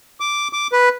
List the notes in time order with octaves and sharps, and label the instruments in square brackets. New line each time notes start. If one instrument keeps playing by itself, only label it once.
[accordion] D6
D6
B4